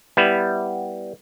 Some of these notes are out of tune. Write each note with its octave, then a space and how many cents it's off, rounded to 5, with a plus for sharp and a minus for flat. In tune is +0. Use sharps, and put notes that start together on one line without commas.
G3 +0 B3 -5 E4 +0